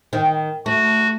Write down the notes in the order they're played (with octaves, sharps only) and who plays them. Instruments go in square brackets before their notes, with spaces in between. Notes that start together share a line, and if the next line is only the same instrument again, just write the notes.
[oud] D#3
[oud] A3 [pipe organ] F#4